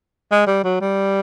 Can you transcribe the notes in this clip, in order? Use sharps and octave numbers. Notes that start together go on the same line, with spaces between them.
G#3
G3
F#3
G3